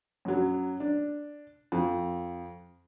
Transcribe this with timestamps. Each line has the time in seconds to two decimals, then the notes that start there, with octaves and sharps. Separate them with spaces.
0.25 F#2 F#3
0.80 D4
1.72 F2